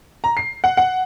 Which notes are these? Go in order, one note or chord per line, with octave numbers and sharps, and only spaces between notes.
A#5
C7
F#5
F#5